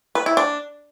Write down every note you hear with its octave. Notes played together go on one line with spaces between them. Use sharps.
B4
E4
D4